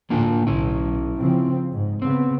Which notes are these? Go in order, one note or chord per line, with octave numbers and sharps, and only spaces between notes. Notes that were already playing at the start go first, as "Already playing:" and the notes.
D2 A2 D3 A#3 D4 F4
B1 C#4 E4
C#3 F3 C4
G#2
C#3 B3 C4